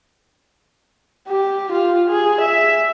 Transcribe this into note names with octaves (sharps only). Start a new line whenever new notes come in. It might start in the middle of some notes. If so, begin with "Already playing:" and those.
G4
F4
G#4
E5